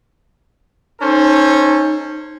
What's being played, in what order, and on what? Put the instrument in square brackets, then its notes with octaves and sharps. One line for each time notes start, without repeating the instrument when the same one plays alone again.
[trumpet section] C#4 A4 C5 [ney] D#4